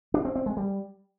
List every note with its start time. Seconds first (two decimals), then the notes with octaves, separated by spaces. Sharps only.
0.14 D4
0.25 C4
0.35 C4
0.46 G#3
0.57 G3